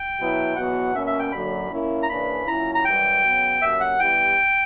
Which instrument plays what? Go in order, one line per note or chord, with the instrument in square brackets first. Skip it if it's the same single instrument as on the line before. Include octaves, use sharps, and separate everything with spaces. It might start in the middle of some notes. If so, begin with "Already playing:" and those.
Already playing: [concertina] G5
[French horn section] B2 F#3 B3 E4
[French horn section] E2 B2 F#3 B3 F#4 [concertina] F#5
[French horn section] B2 A#3 C#4 [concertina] E5
[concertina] E5
G5
[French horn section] F#2 D3 F#3 A#3 [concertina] B5
[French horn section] A#2 A#3 C#4 E4
[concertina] A#5
[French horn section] C#3 E3 A#3 D4 [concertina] B5
[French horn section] A#2 F#3 C#4 E4 [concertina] A#5
[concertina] A#5
[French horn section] F#2 E3 G3 [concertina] G5
[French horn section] C#3 F#3 B3
[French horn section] B2 F#3 A#3 C#4 G4 [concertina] E5
[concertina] F#5
[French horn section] E3 G3 B3 E4 G4 [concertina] G5